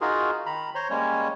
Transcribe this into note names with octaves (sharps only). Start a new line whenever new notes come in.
D#4 F4 F#4 G#4 A#4
D#3 A#5 B5
C5 C#5 A#5 C6
G3 G#3 A#3 C#4 C#5